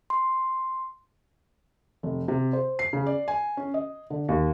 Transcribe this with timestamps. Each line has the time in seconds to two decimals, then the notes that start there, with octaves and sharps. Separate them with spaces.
0.10 C6
2.03 F1
2.28 C3
2.53 C5
2.79 C7
2.93 C#3
3.06 D5
3.28 G#5
3.57 C#4
3.74 D#5
4.10 D3
4.29 D#2